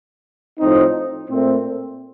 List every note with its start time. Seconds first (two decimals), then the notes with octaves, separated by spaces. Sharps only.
0.60 A2 F3 C4 D#4
1.30 A#2 A3 C4